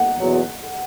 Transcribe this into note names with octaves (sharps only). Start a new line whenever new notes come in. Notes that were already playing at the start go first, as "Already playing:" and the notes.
Already playing: F#5
E2 B2 F#3